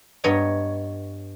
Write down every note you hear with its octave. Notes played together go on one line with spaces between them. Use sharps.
G2 B3 C#5 D#5 G#5 A#5